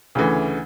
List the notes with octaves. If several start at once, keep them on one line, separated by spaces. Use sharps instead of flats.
D2 C#3 E3 A3